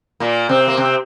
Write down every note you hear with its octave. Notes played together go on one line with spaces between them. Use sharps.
A#2 A#3
C3 C4
A#3
C3 C4